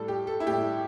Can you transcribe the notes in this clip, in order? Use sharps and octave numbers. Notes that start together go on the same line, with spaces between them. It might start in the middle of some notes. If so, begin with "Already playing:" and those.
Already playing: A2 G3 A4
G4
A4
E4
A2 G3 G4